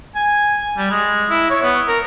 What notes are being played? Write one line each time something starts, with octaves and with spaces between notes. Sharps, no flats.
G#5
G3
G#3
E4
C#5
B3
A#4